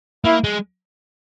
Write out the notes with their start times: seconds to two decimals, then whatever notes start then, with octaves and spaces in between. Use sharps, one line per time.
0.25 A#3 E4
0.44 G#3